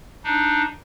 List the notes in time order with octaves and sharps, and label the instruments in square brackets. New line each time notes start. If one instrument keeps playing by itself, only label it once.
[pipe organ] D4 D#4